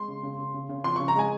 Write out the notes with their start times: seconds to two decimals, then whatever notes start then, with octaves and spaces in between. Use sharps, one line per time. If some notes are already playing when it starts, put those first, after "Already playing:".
Already playing: G#3 C6
0.08 C#3
0.23 C#3
0.38 C#3
0.54 C#3
0.69 C#3
0.84 F3 C6
0.96 C#3 C#6
1.08 A#5
1.15 G#3 G#5